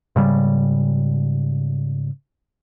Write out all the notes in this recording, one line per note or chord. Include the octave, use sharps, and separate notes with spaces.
G#2 C#3 G3